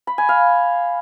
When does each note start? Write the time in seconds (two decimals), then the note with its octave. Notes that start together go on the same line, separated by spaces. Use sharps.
0.07 B5
0.18 G#5
0.29 F5